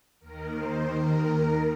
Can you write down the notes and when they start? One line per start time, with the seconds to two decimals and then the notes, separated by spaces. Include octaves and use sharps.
0.20 D#2 D#3 A#4
0.54 C5
0.88 A#4